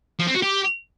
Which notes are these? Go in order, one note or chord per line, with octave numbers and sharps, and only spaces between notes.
F3
C4
F#4
G4